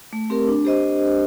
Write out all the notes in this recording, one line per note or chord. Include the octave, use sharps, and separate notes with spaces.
A3
C4 G4 A#4
D4
G4 C5 D#5